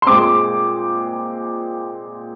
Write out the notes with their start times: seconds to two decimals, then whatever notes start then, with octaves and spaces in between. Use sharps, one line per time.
0.02 C6
0.06 A#2 G#3 C4 D6